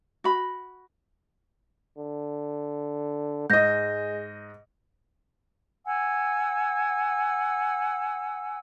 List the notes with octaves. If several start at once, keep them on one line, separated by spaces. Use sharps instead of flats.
F#4 B5
D3
G#2 G#3 D#5 G6 A#6
F#5 G#5 E6